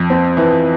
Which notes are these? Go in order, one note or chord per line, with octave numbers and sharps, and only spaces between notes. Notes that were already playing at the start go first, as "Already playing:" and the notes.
Already playing: F2
C4
E3